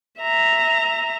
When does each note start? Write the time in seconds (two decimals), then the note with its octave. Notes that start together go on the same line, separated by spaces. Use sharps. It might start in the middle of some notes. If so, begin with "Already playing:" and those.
0.21 E5 A#5